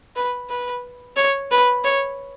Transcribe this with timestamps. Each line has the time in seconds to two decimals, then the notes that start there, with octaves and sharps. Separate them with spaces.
0.16 B4
0.50 B4
1.17 C#5
1.51 B4
1.84 C#5